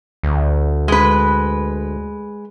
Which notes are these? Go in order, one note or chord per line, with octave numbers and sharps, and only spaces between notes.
D2
G#3 B4